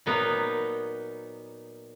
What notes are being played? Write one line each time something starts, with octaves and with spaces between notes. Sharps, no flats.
A#2 F#3 A#3 B3 D#4